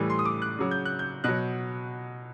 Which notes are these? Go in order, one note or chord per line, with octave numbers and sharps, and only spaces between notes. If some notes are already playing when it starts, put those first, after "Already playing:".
Already playing: A2 E3 G3
C6
D#6
D6
F#6
C#3 F#3
G6
F#6
G6
B2 F#3 F#6